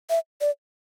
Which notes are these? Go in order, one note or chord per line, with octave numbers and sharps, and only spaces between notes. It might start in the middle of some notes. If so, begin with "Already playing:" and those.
E5
D5